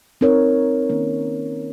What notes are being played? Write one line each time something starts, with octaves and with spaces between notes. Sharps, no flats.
C4 D#4 A#4 C#5
D#3 A#3 C#4